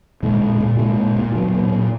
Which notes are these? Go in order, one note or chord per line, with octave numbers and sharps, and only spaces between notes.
A#2 G#3
A#2
A#2
A#2 G#3
A#2
A#2
A#2 F#3
A#2
A#2